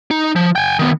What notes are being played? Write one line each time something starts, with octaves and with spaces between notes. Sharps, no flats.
D#4
F3
G5 G#5
D#3 B3